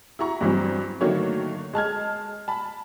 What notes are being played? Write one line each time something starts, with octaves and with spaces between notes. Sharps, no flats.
E4 F#4 A#5 C#6
G2 E3 F#3 C4
D3 D#3 F#3 A3 A#3 C#5
G#3 A5 F6 G#6
A5 B5